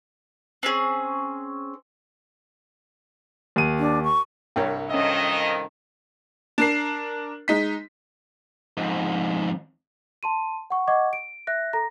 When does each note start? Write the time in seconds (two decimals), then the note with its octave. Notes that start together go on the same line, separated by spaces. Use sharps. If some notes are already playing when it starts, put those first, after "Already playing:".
0.63 C4 C#4 G#4
3.56 D#2 D#7
3.79 D4
4.04 C#6
4.56 C2 G2 A#4 C#5 G5
4.90 F2 D#3 C#4 D#5 E5
6.58 D4 A#4 C7
7.48 G#3 D#4 B6
8.77 F2 G#2
10.23 A5 C6 D#7
10.70 F#5 C#6
10.88 D#5 F#5 C#6 D6 G#6
11.13 D7
11.47 E5 F#6 A#6
11.73 A4 A#5 A#6